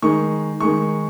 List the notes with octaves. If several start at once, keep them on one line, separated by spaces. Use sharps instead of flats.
D#3 G#3 D#4 C#6
D#3 G#3 D#4 C#6